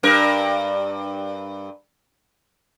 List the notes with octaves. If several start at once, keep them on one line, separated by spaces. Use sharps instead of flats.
G2 A#4